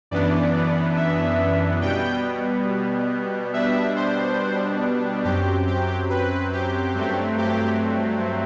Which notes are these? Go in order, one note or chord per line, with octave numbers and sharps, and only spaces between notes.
F#2 E3 B3 D4 D5
E5
B2 G3 B3 G5
B2 G3 B3 D4 E5
C5
F#2 F#3 C4 G4
G4
B4
G4
G2 F#3 A3 C4
G4